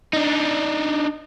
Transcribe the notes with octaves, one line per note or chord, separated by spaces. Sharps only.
D4 D#4